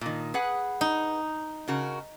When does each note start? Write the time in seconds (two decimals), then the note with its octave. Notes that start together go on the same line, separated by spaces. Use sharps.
0.01 A#2 D#3
0.34 G#4 B4 F#5
0.81 D#4
1.68 C#3 F#4 A#4